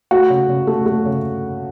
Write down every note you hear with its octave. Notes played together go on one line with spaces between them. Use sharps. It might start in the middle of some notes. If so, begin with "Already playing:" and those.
A3 F#4
C#3
C#3
A3
A3
C#3